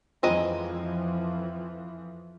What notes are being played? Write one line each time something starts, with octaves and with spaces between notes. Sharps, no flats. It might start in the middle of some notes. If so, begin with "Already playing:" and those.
F2 E3 F3 G#3 C4 F4 D#5 A#5